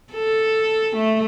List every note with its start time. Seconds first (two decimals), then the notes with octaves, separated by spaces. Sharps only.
0.13 A4
0.96 A3